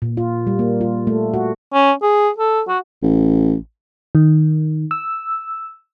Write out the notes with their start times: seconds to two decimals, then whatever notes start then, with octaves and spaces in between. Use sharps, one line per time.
0.02 A#2
0.17 F4
0.47 G3
0.59 A#3
0.81 F4
1.07 A3
1.34 F#4
1.74 C#4
2.02 G#4
2.38 A4
2.68 F#4
3.03 A1
4.15 D#3
4.91 E6